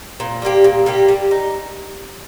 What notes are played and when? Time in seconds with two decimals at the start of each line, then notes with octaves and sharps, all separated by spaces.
0.20 A#2
0.42 G3 A#3 G4
0.64 A#2
0.86 G3 A#3 G4
1.09 G3
1.31 D#4